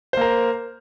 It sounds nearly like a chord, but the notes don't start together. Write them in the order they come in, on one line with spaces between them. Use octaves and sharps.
C5 A#3 A#4